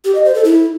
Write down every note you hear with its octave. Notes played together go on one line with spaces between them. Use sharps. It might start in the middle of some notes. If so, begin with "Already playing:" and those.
G4
D#5
C5
A4
E4